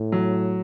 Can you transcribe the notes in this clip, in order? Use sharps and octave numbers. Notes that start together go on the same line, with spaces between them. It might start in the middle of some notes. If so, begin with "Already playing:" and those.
Already playing: A2
F#3